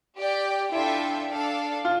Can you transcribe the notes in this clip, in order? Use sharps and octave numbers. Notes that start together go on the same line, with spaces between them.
G4 D5 G5
D4 E4 F4 A4 E5 G5
D4 A4 D5 F5 A5
F4